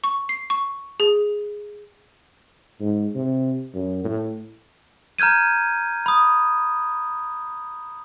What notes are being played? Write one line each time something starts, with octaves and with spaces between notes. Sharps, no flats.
C#6
C7
C#6
G#4
G#2
C3
F#2
A2
A#5 F6 G6 G#6 D#7
B5 D#6